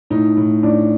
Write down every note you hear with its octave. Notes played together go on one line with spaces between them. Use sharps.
A2 D#4
A2
A2 D4